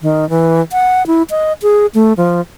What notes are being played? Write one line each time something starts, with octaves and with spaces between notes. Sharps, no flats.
D#3
E3
F#5
E4
D#5
G#4
A3
F3